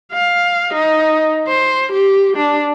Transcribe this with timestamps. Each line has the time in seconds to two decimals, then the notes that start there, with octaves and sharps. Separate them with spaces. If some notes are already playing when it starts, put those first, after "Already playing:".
0.13 F5
0.74 D#4
1.47 C5
1.92 G4
2.37 D4